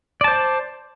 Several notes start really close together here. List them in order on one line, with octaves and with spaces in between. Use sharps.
D5 A5 C5